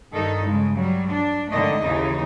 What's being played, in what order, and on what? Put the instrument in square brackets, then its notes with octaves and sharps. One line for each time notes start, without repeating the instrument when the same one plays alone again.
[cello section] G2 D#3 D#4 A4
C#3 G#3
F#3 G3
D4
G#2 D3 D#3 A3 D#5
D#2 C#3 E3 D#4